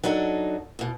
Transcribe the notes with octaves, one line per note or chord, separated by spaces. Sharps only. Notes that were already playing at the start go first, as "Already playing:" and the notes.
F#3 D4 D#4 F#4 A4
E2 B2